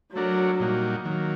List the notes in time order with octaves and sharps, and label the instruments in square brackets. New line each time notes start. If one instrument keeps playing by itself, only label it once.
[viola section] F#3 [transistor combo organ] A3 D4 F#4 A#4
[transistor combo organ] A#2 G3 A#3 D#4 F#4
D#3 F#3 A#3